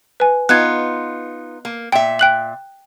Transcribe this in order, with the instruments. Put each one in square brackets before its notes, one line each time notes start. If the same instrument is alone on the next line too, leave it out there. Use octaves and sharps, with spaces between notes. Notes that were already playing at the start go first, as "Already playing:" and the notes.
[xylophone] B4 G#5
[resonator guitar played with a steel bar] B3 D#4 F4 [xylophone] F#6 G#6
[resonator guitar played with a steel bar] A#3
[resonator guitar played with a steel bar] A#2 E5 [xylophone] G5
[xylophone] G5 F#6 F#7